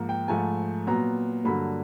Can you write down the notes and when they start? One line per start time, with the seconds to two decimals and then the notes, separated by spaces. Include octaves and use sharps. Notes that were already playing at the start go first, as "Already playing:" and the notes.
Already playing: G#2 F3 A#3
0.09 G5
0.28 G#2 F3 A3 G#5
0.87 A#2 F#3 B3 A#5
1.44 G2 D3 F#3 A#3 B5